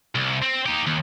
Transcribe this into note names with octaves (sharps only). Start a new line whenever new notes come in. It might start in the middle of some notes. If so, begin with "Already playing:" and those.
C2
C4
D#4 G4
D#2